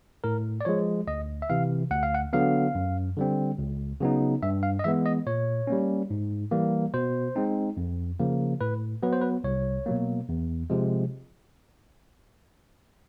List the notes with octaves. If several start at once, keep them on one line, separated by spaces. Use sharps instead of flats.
A2 A#4
D5
F3 G#3 C#5
D2 D#5
E5
C3 E3 F5
D2 F#5
F5
F#5
D3 F#3 B3 F5
F#2
D3 G3 C4
C#2
C#3 F#3 B3 D#4
G2 E5
F5
D#5
E3 G#3 B3 E5
D#5
A#2 C#5
G3 A#3 C#4
G#2
E3 G3 A#3
B2 C5
G#3 C4 D#4
F2
C#3 F3 A#3
A2 B4
F#3 B3 B4
C5
B4
C2 C#5
B2 F#3 A#3
E2
C3 F3 G#3